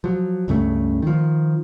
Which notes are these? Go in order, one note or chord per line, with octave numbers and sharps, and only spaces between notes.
F3 F#3
C#2 G2 C#3 A3
D#3 F3